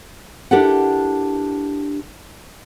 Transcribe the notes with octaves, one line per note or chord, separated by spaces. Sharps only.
D4 E4 G4 A4 A#4 F#5